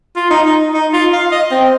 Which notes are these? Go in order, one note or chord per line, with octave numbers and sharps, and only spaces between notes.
F4
D#4
D#4
D#4
F4
F5
D#5
C4